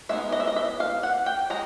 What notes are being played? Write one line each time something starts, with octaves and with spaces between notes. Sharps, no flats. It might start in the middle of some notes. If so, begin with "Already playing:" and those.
G#3 B3 D#4 E5
D#5
E5
D#5
E5
F5
F#5
G5
G#3 A#5